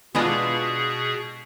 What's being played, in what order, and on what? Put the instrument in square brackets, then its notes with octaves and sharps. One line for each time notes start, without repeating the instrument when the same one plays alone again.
[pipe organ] B2 G#4 [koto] G#3 E4 D#5 [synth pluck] B3 D4 F4